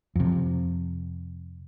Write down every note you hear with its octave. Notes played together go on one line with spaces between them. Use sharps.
F2 C3